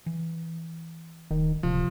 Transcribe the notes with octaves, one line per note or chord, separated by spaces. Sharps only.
E3
D1 D#3
D1 C3 F3